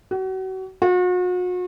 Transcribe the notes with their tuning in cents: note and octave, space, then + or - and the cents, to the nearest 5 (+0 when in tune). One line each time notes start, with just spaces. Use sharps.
F#4 +35
F#4 -40